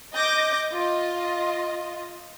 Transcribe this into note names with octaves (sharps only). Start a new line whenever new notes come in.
D#5 D6 G6 A#6
F4 D#5